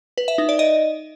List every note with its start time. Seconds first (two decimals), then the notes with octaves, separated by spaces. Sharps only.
0.18 B4
0.28 E5
0.38 D#4
0.49 D5
0.59 D#5